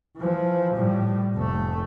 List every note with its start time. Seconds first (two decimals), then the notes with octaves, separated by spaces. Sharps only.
0.17 E3 F3
0.74 A2 G3
1.36 F1 A3